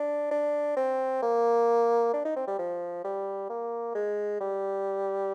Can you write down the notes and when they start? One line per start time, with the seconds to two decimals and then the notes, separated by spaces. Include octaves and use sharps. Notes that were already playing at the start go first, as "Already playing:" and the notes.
Already playing: D4
0.31 D4
0.77 C4
1.22 A#3
2.13 D4
2.25 D#4
2.36 C4
2.47 G3
2.59 F3
3.04 G3
3.50 A#3
3.95 G#3
4.41 G3